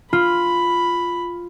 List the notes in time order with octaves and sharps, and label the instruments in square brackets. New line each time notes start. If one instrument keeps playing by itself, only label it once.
[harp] F4 [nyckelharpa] B5